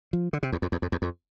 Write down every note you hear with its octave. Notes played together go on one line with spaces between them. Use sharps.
F3
D3
C3
E2
F2
E2
F2
E2
F2